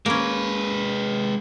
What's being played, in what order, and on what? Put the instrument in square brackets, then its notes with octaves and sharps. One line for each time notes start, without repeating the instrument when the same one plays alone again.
[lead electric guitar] G#3 B4 [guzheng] A#3 C#4